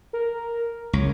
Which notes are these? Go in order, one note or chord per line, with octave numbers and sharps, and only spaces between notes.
A#4
C#2 C#5